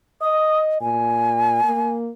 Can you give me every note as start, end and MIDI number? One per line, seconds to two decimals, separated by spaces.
0.21 0.78 75
0.21 0.60 87
0.81 1.60 46
0.81 1.92 80
1.64 2.10 58